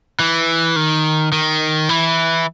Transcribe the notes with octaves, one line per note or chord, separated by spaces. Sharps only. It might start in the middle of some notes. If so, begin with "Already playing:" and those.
E3
D#3
D#3
E3